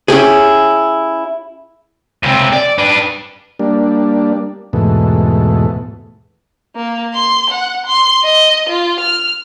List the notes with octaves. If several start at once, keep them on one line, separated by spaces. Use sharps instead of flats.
C#4 E4 G4 G#4
C#2 C3
D5
D4 B4
G3 A#3 D4
E2 G#2 B2 A3
A#3
C6
F#5
C6
D#5
F4
F6